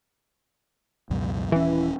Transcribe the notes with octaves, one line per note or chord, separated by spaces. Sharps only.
C#2 F#2 B2
D#1 E3 C#4